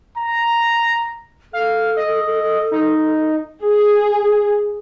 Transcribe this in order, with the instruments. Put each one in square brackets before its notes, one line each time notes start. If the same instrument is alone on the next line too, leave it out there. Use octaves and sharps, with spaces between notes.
[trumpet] A#5
[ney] A4 [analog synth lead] F5
[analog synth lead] D#5
D#4
[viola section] G#4